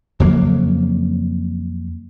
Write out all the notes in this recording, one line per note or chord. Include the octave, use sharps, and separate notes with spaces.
F2 C#3 F#3 A#3